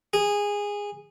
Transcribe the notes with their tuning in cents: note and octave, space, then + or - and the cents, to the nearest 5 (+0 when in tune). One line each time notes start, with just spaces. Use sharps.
G#4 -15